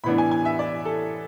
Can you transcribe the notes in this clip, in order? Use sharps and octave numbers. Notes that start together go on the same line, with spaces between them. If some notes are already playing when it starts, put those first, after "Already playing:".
A2 E3 B3 D4 B5
G#5
G#5
E5
D5
A4